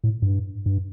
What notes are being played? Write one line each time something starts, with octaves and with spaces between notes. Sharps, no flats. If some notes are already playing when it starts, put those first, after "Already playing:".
A2
G2
G2